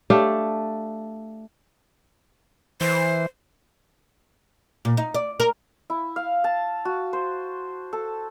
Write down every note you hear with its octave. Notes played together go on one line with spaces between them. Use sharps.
A3 D4 G4 F5
E3 C5
A#2
D#4
D5
A#4
E4
F5
A5
F#4
C5
A4